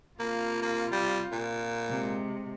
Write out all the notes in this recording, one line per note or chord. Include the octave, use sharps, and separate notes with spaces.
C3 A#3 F4
A#3
G3
A#2
C3 G#3